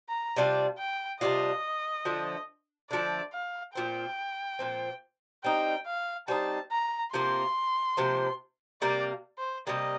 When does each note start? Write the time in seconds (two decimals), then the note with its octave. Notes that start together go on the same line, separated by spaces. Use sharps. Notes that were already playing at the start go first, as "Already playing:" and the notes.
0.09 A#5
0.36 C3 G3 D4 F4
0.78 G5
1.21 C3 G3 D4 F4 D#5
2.05 D3 F3 A3
2.91 D3 F3 A3 D5
3.33 F5
3.74 A#2 F3 C4 G5
4.59 A#2 F3 C4
5.44 G3 C4 D#4 G5
5.87 F5
6.28 G3 C4 D#4 A5
6.71 A#5
7.13 C3 F3 A#3 C6
7.97 C3 F3 A#3
8.82 C3 G3 A#3 D5
9.38 C5
9.67 C3 G3 A#3 D#5